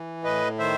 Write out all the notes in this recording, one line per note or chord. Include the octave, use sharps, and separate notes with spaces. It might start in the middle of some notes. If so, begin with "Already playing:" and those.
Already playing: E3
A2 B4 D#5
D#3 C5 E5